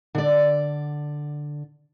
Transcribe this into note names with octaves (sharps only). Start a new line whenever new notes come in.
D3 D5